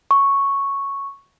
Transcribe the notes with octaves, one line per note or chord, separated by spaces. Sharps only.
C#6